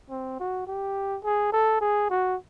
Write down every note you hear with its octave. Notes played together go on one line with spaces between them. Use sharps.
C4
F#4
G4
G#4
A4
G#4
F#4